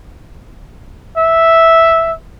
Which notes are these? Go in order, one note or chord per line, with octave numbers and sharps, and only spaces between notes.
E5